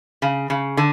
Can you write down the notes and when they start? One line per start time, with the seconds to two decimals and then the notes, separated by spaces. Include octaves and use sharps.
0.22 C#3
0.50 C#3
0.77 D3